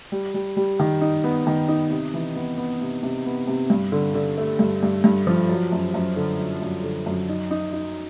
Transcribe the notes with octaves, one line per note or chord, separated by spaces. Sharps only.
G3
G3
G3
D#3
D#4
B3
D#3
D#4
C3
E3
B3
B3
C3
C3
B3
C3
G2
D3
D3
A3
G2
G2
G2
F3
F#3
F#2
F#2
D3
F#3
F#2
D3
F#2
D#4
D#4
D#4